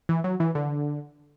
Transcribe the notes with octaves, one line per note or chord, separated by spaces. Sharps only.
E3
F#3
E3
D3